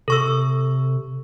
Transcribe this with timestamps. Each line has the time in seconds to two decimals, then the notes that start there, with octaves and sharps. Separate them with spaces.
0.08 C3 A4 C#6 E6